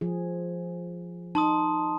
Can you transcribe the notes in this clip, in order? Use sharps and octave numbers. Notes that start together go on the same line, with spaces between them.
F3 G#4
D#4 A5 C6 D#6